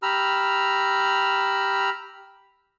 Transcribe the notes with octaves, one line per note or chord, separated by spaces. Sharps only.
G4 A#5 B5 E6 F6